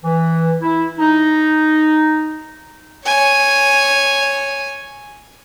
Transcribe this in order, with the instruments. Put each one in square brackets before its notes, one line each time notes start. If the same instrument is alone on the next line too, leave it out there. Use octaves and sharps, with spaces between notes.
[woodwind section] E3
E4
D#4
[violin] C#5 G#5